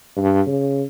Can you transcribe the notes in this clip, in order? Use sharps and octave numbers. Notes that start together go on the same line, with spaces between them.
G2
C#3